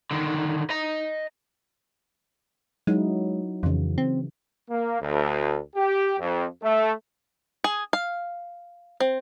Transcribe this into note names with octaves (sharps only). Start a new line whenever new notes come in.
D3 D#3
D#5 A#5
F#3 G#3 D#4 E4
F2 C#3 E3
C4
A#3
D2
G4
F2
A3
G#4
F5
C4